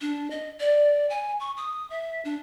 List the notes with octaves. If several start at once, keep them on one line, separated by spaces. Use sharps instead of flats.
D4
D#5
D5
G#5
C#6
D#6
E5
D4